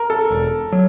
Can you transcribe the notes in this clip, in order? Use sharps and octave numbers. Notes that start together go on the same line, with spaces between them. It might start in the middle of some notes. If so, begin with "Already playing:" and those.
Already playing: A#4
A4
E1
F#3